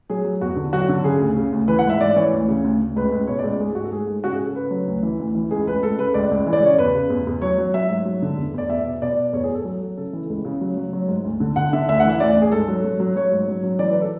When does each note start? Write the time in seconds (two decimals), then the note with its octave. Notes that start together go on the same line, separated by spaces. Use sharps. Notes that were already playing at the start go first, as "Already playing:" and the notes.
0.10 F#3 G#4
0.24 F#3
0.41 E2 F#4
0.56 D3
0.73 F#3 F#4
0.89 D3
1.04 C#3 G#4
1.20 D2
1.36 C#3
1.52 D2
1.68 E3 B4
1.79 F#5
1.85 G#2 E5
2.00 G#2 D5
2.16 E3 C#5
2.33 D2
2.48 C#3
2.64 D2
2.80 D2
2.96 C#2 B4
3.12 C#2
3.27 B2 C#5
3.39 D5
3.44 C#2
3.59 G#2 G#4
3.75 G#2 F#4
3.84 A4
3.92 G#2 G#4
4.07 G#2
4.24 C#3 F#4
4.34 G#4
4.39 C#3
4.45 A4
4.55 C#3 B4
4.71 F#3
4.88 D2
5.03 E3
5.20 D2
5.35 E3
5.51 C#2 G#4
5.67 C#2 B4
5.83 C#2 A4
5.98 C#3 B4
6.14 C#2 D5
6.31 C#2
6.47 E3
6.53 D5
6.63 C#3 C#5
6.78 E2 B4
6.95 C#3
7.10 E2
7.27 E2
7.42 F#3 C#5
7.58 F#3
7.74 F#3 E5
7.90 G#2
8.05 F#3
8.22 D3
8.38 E2
8.54 E2 D5
8.69 E2 E5
8.86 B2
9.02 B2 D5
9.18 B2
9.33 E2 C#5
9.43 G#4
9.49 E2 A4
9.65 F#3
9.81 F#3
9.97 C#3 A4
10.13 E3
10.30 C#2
10.45 C#3
10.61 F#3
10.77 F#3
10.93 F#3
11.08 G#2
11.25 D2
11.40 D3
11.56 D3 F#5
11.73 D3 E5
11.88 D2 E5
12.00 F#5
12.05 E3 E5
12.20 D2 D5
12.36 D2
12.42 G#4
12.52 G#2 A4
12.68 F#3
12.84 F#3
13.00 F#3
13.16 F#3 C#5
13.32 G#2
13.48 F#3
13.64 F#3
13.79 E3 D5
13.91 B4
13.96 E3 A4